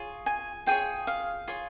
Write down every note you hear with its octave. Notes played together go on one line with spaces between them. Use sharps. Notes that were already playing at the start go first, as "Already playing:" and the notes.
Already playing: F4 G#4 C#5
G#5
F4 G#4 C#5 G5
F5
F4 G#4 C#5